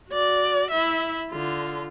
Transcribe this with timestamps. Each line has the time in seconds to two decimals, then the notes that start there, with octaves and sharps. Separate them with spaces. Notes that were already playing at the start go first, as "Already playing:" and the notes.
0.11 F#4 D5
0.70 E4 E5
1.32 D3 F4